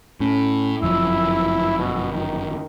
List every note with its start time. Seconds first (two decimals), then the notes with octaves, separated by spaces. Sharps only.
0.20 A2 C#4
0.82 G1 F#2 F3 E4 E6
1.78 B2
2.12 D#3